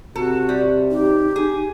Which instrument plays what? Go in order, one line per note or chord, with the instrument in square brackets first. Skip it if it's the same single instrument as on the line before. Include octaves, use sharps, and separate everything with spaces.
[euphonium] C3 [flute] F#4 [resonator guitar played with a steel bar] A4
[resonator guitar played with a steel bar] G3
[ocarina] D#4 [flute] G4
[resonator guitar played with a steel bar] G#4